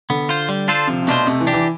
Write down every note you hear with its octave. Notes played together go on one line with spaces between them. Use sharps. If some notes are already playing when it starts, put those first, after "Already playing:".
D3 B3
F4 C5
G3
D4 F4 A4 C5
C3 F3
C3
B2 A3 D4 F4 C5
C3 A3
E3
D4 G4
E3